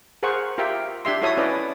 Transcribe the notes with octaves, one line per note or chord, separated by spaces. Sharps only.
G#4 A#4 C5 F#5 C#6
F4 G4 A#4 E5 G5
D4 G4 E5 C6
E4 F#4 A4 C#5 E5 D#6
C#4 E4 B4 D5 D#5